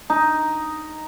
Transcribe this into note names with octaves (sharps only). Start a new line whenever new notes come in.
D#4